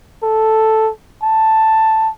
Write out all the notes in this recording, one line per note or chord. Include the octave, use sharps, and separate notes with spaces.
A4
A5